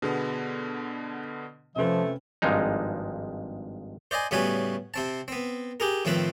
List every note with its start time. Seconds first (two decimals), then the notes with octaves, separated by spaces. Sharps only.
0.02 B2 D3 B3 G#4
1.76 F2 C3 F3 A3 C#4 B4 E5
2.42 G#1 G2 F3 G#3 D#4
4.11 C5 D5 D#5 G#5
4.31 A2 C#3 G3 B3 F#4 G#5
4.94 C3 C4 A5
5.28 B3 C4
5.80 G4 G#4 A#4
6.05 A2 D#3 F3 C4 B4